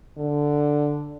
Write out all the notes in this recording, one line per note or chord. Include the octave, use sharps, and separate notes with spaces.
D3